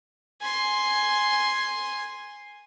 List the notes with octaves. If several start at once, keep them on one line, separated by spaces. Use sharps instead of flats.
G#5 C6